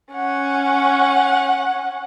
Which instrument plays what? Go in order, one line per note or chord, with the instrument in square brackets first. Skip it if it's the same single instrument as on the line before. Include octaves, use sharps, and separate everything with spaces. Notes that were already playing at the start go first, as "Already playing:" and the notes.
[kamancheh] C#4 F#5